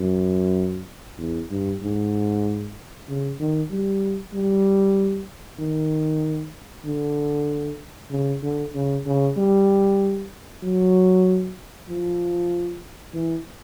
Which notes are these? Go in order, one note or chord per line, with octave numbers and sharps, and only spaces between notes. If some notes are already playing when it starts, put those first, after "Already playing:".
Already playing: F#2
E2
G2
G#2
C#3
D#3
G3
G3
D#3
D3
C#3
D3
C#3
C#3
G3
F#3
F3
E3